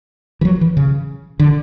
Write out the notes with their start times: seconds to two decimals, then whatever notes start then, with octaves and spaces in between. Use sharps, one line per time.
0.41 E3
0.45 F#3
0.61 E3
0.77 C#3
1.39 D3